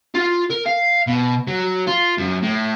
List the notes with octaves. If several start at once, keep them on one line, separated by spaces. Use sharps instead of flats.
F4
A#4
F5
B2
F#3
F4
F#2
A2